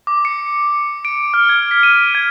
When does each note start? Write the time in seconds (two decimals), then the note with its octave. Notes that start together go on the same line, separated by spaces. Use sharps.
0.07 D6
0.25 C#7
1.05 D7
1.34 F6
1.49 G#6
1.71 B6
1.83 D#7
2.15 G#6